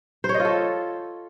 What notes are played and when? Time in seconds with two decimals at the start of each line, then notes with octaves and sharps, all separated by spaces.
0.24 C5
0.29 C#5
0.34 D#5
0.40 F4
0.45 A4